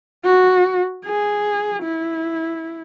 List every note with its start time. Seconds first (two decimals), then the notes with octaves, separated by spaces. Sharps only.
0.25 F#4
1.06 G#4
1.83 E4